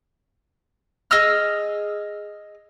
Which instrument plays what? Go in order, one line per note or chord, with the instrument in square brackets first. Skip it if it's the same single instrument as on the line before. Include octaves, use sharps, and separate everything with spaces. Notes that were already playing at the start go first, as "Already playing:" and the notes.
[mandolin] G#4 D#5 E6 F6